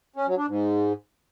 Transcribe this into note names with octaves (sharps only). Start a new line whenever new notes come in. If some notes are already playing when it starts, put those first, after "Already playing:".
C#4
F#3
D4
G#2